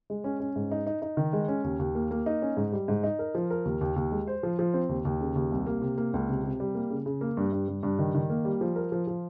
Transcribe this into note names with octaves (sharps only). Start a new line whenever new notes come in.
G#3
C#4
C#4
G#2
D#4
D#4
D#4
D#3
G#3
C#4
D#2
D#2
A#3
A#3
D#4
C#4
G#2
G3
G#2
D#4
A#4
F3
A#4
D#2
D#2
D#2
G#3
C5
F3
F3
C4
D#2
D#2
C#3
D#2
C2
A#3
C3
A#3
C#2
C3
C3
G3
A#3
C#3
C#3
A#3
G2
G2
G2
G2
D#3
D#3
A#3
G3
F3
A#4
F3
F3